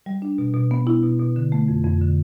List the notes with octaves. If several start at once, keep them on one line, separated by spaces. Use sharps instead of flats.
G3
D4
B2
B2
B3
E4
B2
B2
D3
A3
F2
F2
D3